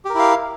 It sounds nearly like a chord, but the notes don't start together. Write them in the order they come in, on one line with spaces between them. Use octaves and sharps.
G4 A#4 E4 F5